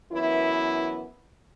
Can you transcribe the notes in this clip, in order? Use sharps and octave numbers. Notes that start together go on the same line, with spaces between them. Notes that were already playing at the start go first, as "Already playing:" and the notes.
F#2 E3 B3 E4